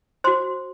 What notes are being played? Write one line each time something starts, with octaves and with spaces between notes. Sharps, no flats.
F#4 C5 C6